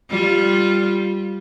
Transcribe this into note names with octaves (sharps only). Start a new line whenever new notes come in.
G3 F4